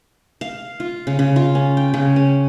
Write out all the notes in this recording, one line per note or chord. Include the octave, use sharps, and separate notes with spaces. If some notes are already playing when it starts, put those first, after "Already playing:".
F5
F4
C#3
C#3
F4
C#4
G5
C#3
C#4